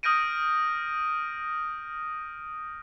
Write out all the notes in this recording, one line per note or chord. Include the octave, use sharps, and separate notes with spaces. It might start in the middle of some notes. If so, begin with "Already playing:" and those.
D#6 F6 G6 A#6 D7 D#7